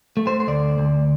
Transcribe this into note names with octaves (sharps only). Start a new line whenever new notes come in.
A3
C5
C5
D2 D5
D2